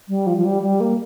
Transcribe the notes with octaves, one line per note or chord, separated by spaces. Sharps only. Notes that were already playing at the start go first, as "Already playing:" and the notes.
G3
F3
F3
G3
G3
A#3